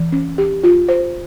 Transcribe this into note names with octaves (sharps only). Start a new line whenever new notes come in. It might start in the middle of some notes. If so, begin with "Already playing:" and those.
Already playing: E3
C#4
G4
F4
C5